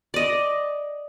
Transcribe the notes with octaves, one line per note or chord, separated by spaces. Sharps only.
D5 D#5